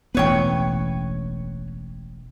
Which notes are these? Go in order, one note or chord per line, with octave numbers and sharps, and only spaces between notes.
E1 A1 B3 B4 C#5 G5